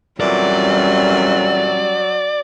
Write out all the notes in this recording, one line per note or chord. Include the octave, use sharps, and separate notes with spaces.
F2 A#2 E3 F#3 G3 C#4 D5